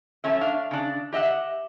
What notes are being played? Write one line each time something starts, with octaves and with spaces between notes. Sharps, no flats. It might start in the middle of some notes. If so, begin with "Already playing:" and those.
F#2 A3 C#4 E5
D4 F5
C#3 D4
G4 D#5 E5 F#5